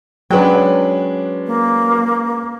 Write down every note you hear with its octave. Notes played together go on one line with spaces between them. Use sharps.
F#3 G#3 C#4 D4 B4 G5
A#3